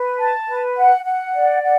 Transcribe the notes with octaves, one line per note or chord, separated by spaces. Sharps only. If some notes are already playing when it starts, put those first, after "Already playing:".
Already playing: B4
A5
B4
F#5
F#5
D5
F#5